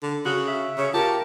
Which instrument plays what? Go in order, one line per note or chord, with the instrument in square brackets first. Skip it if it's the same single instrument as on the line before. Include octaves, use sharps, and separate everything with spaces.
[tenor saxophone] D3
[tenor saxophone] C#3 [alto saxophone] F#4
[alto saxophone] E5
[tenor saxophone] C#3 [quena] C#5
[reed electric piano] F4 [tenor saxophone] G4 [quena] A#4 [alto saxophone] A5